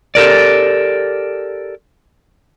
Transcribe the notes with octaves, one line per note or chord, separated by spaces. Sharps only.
G4 A4 A#4 D5